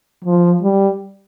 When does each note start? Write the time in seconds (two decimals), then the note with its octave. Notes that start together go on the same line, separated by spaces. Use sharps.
0.25 F3
0.62 G3